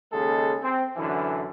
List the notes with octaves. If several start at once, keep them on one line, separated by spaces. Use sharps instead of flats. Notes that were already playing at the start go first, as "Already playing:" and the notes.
D#2 C#3 G#3 G#4 A4
C4
F#2 D3 E3